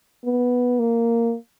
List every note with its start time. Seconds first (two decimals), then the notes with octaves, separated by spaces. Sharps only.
0.25 B3
0.79 A#3